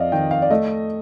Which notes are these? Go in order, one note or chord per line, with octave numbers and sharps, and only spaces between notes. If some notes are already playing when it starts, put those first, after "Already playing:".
Already playing: F2 D5 D#5 F5
D#3 G5
F5
D5
A3 D#5